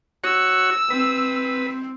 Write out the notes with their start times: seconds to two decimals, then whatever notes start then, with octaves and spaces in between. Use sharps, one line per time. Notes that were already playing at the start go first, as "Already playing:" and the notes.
0.24 F#4 C#5 E6
0.90 C4 B4